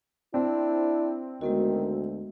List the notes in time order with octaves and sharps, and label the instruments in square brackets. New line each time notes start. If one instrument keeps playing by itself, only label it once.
[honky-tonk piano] C4 [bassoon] D4 [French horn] E4
[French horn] D2 [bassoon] D#3 [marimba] G#3 B3 F#4